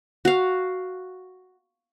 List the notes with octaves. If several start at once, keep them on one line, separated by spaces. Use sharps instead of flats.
F#4 F5